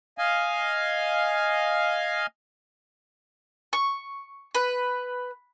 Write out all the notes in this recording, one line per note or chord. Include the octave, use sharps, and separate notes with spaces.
D#5 F5 G#5
C#6
B4